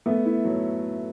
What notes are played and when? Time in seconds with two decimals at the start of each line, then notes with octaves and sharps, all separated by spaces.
0.06 A3 B3
0.25 E4
0.45 F#3